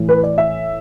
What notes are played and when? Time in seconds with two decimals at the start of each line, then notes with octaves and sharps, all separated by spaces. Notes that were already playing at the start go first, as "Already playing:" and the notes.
Already playing: A2 E3
0.09 B4
0.23 D5
0.38 E5